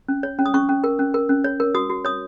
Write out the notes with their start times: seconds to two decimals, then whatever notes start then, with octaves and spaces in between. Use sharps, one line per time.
0.08 C#4
0.23 C#5
0.39 C#4
0.46 D#6
0.54 C#4 C#6
0.69 C#4
0.84 A#4
0.99 C#4
1.14 A#4
1.29 C#4
1.44 C#5
1.60 A#4
1.75 F#4 D#6
1.90 F#4
2.05 C#5 D#6